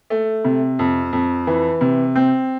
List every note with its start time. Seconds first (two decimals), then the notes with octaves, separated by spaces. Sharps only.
0.10 A3
0.44 C3
0.79 F2
1.13 F2
1.47 E3
1.81 C3
2.16 C4